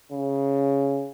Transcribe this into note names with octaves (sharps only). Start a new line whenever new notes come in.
C#3